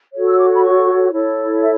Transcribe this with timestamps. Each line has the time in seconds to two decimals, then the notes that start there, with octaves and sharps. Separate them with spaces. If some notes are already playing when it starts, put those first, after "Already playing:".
0.14 F#4 A4 C#5
0.27 E6
0.38 D6
0.55 B5
0.63 C#6
1.12 E4 A4 C#5
1.62 E5